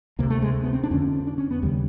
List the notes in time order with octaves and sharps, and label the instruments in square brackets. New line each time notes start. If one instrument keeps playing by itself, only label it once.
[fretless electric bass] D2 C3 A#3
A3
G#3
A#3
B3
C4
D4
F2 D3 C#4
D4
C#4
B3
D#2 C#3 G3